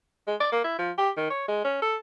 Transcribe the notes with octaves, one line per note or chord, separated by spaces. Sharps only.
G#3
D5
A#3
E4
F3
G4
D#3
C#5
G#3
C#4
A4